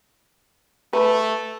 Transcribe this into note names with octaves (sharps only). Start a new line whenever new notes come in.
A3 B4